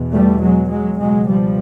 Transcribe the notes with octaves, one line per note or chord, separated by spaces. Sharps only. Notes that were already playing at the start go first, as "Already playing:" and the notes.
Already playing: E2 B2
G3 A3
F#3 G#3
F#3 G#3
C#2 B2 F#3 G#3
F3 G3